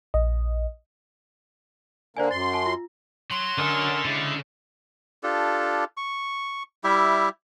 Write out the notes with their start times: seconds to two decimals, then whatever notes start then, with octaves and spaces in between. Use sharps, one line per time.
0.14 A#1 D#5
2.17 D3 A#3 C5 D5 G#5
2.31 F#2 C6 A6
2.53 G#5 A5
2.66 F4
3.31 F#3 C6
3.58 D3 C#4 A4 A#4 D#5
4.05 C#3 G#3 E4
5.23 D4 F4 G4 A4
5.97 C#6
6.84 G3 E4 G4 E5